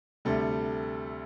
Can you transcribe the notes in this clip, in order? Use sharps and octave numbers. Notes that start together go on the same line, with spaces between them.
D2 C3 G3 A4